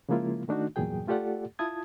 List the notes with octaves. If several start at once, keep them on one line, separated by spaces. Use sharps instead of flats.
C#3 F3 G#3 A#3 E4 F4
D#3 A3 D4 D#4 F#4
E2 G2 A#2 F#3 G#4 G5
A3 F4 G4 A4 D5 F#5
E4 F4 A5 D#6 G#6